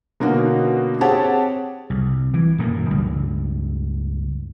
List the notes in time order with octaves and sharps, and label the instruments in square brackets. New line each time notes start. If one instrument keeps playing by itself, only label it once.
[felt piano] B2 D3 A#3 C#4 D#4 F#4
C4 G4 G#4 C#5 F#5 A5
[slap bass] C2
E3
D#1 F#2 A#3
C#2 G2